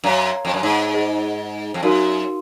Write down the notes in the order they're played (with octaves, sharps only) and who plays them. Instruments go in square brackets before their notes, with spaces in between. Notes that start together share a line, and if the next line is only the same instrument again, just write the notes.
[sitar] F#2 [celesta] C#5 F5 A#5
[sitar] F2
F#2
G#2
[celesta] G#4 C5 D#5
[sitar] F2
[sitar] F#2 [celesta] D#4 F#4 A#4 F5 C6